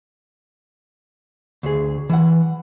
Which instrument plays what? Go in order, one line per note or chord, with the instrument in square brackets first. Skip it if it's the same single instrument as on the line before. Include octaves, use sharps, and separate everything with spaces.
[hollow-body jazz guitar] D2 G#4
E3 F#5